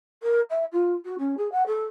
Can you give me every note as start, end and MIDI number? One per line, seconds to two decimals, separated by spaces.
0.22 0.40 70
0.50 0.64 76
0.72 0.93 65
1.05 1.15 66
1.18 1.35 61
1.37 1.50 68
1.51 1.63 78
1.66 1.85 69